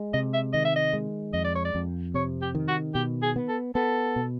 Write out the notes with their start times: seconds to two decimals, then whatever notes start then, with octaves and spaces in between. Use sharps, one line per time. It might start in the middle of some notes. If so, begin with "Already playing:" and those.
Already playing: G#3
0.14 C3 D#5
0.34 E5
0.53 D#3 D#5
0.65 E5
0.76 D#5
0.93 G#3
1.33 F2 D#5
1.44 D5
1.55 C#5
1.65 D5
1.75 F2
2.14 C3 C#5
2.42 G4
2.55 D#3
2.68 F#4
2.95 B2 G4
3.22 G#4
3.36 B3
3.49 A4
3.75 B3 A4
4.16 B2